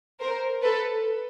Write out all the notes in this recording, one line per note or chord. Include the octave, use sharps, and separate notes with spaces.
A#4 C5
A4 B4